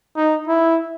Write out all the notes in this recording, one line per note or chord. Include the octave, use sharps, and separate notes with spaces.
D#4
E4